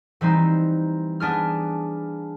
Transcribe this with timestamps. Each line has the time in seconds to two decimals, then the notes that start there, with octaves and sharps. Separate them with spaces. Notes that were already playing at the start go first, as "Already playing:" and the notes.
0.21 E3 G3 C4 D#4
1.20 B3 D4 G#4 F6